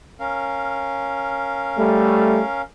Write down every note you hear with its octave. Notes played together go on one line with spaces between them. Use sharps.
C#4 A#4 F5
G3 A3